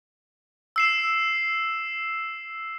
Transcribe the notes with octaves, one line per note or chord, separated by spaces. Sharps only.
E6 C7 E7